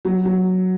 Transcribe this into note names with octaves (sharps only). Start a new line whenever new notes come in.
F#3
F#3